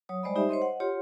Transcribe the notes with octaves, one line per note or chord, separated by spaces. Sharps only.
F#3 C#5 D#6
G3 G#3 C5 D5 D#5 B5
D#4 G4 C5 E5
C5 C#5 D#5 C6
D#5 F#5
F4 G4 C#5 F#5 C6